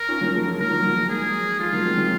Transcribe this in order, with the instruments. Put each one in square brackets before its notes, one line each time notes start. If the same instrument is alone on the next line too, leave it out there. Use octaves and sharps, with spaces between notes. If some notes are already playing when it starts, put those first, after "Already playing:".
Already playing: [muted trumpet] A#4
[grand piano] C#4 F4
F#3 A#3
F3 G#3
F3 G#3
[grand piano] F#3 A#3 [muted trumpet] A#4
[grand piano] F#3
F#3 A#3
F3 G#3
[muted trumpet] G#4
[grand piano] F3 G#3 [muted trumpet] F4
[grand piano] F#3 A#3
G#3 C4
F#3